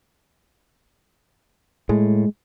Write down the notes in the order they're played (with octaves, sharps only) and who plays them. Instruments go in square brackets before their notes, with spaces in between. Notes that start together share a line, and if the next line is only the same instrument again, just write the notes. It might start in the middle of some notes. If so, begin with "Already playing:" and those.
[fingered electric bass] A2 [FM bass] G#3